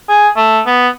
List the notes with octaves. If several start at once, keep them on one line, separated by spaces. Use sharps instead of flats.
G#4
A3
B3